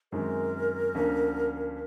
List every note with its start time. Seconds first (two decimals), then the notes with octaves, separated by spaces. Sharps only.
0.12 F#2 D#3 G#3 C4 D#4 A#4
0.95 D2 D3 F3 A#3 C#4